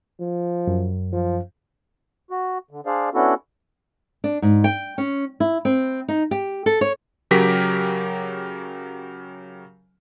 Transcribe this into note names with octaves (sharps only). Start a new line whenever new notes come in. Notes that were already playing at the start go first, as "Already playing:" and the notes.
F3
F#2
F3
F#4
D3
D4 G#4 C5 D5 F5
B3 C#4 D4 E4 F#4 A4
D4
G#2
G5
C#4
E4
C4
D#4
G4
A4
C#5
C#3 F#3 G4 A#4 B6